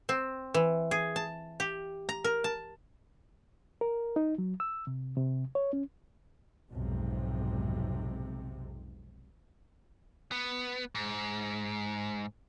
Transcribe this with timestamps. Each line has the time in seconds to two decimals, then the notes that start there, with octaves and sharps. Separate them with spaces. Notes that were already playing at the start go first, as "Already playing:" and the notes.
0.09 C4
0.54 E3
0.91 G#4
1.16 A5
1.60 G4
2.09 A#5
2.24 A#4
2.44 A5
3.81 A#4
4.16 D#4
4.38 F#3
4.60 E6
4.87 C3
5.17 C3
5.55 C#5
5.73 C#4
6.70 B1 F2 G#2 C3
10.32 B3
10.95 G#2